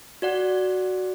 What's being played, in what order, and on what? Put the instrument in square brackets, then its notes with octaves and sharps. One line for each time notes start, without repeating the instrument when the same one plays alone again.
[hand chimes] F#4 D5 F#5